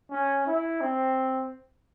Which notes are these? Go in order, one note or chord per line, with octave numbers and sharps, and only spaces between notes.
C#4
E4
C4